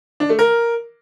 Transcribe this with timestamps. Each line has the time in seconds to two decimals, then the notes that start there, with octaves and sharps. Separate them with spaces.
0.20 D4
0.29 A3
0.39 A#4